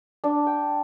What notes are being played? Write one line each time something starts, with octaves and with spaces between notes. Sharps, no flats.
D4
G5